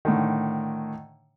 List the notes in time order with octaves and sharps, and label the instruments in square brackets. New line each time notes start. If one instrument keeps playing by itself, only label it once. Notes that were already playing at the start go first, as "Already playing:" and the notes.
[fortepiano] A2 D3 D#3